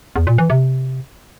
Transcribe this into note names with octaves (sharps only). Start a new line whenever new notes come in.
E2
A#2
E3
C3